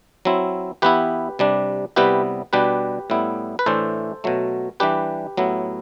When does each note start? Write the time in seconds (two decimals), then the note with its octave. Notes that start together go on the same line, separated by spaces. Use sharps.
0.25 F#3 C4 E4
0.82 E3 B3 E4 G4 B4
1.39 C3 G3 D4
1.96 C3 G3 B3 E4 G4 B4
2.53 B2 G3 D4 G4 B4
3.10 A2 G3 B3 E4
3.59 B4
3.66 A2 E3 A3 D4 A4 C5
4.24 B2 F#3 A3
4.80 E3 G3 D4 G4 B4
5.37 A2 F#3 B3 E4